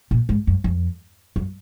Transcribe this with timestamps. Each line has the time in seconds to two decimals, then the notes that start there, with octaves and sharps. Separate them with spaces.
0.11 A#2
0.29 G#2
0.47 F#2
0.64 F2
1.36 F#2